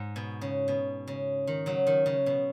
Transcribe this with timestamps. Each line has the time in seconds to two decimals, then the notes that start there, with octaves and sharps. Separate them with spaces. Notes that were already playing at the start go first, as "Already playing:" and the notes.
Already playing: G#2
0.16 B2
0.41 C#3
0.68 B2
1.08 C#3
1.47 D#3
1.66 C#3 F#3
1.87 D#3
2.06 C#3
2.26 B2